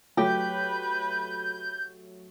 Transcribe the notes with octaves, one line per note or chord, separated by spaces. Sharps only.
F#3 A3 G4 B4 C#5 G6